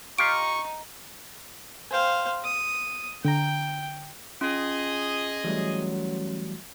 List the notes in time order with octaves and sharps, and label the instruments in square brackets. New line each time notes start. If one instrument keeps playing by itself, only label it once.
[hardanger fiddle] D#4 [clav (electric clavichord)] F4 G4 F5 [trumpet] C#6 [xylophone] D7
[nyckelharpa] C5 F5 [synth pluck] G5 G#5
[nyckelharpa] D#6
[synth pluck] D3 A#5 [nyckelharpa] G5
[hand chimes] C#4 C6 [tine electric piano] F4 [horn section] G#4 D#5
[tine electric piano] E3 G3 A3 [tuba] F#3